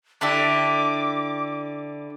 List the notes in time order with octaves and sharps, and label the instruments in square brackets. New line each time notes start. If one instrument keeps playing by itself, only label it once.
[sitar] D3 A4 [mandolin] D4 E4 G4 [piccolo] D6